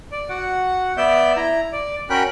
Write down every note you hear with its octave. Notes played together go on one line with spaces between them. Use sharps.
D5
F#4 F#5
B3 D5 E5 G6
E4 A#5
D5
C#4 F#4 A#4 G5 B5 F#6